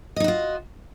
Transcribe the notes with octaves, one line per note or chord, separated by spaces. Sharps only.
D#4 F4 F#4 D#5